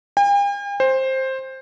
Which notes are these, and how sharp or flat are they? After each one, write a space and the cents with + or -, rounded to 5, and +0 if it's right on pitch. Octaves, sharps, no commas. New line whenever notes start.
G5 +45
C5 +10